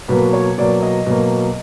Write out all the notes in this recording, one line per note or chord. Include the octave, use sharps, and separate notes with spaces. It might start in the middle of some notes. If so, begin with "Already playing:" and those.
B2 F#3 A#3 B4
C#5
B2 F#3 A#3 D5
D#5
B2 F#3 A#3